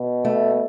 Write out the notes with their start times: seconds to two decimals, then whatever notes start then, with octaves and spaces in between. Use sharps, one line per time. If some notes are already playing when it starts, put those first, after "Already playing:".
Already playing: B2
0.25 A3